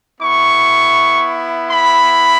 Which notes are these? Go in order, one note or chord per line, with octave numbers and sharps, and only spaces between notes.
B3 E4 C#6
B5